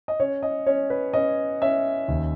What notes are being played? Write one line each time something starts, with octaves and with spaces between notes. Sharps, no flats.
D#5
C#4 C#5
D#5
C#4 C#5
B4
C#4 D#5
C#4 E5
D#2